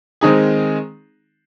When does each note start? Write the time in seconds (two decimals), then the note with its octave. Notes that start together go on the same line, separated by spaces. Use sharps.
0.21 D#3 G#3 C4 D#4 G#4